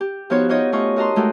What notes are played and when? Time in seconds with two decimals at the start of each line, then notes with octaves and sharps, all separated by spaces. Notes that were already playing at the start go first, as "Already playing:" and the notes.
0.01 G4
0.30 F3 B3 D#4 F4 F#4 C#5
0.49 D#4 F4 G4 C#5 D#5
0.72 A3 C#4 F4 D#5 C#6
0.96 F#4 A#4 D#5 A5 A#5 C6
1.16 G#3 A3 F#4 G4